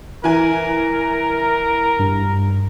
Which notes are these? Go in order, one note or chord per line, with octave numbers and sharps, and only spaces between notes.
E3 A#4 G#5
G2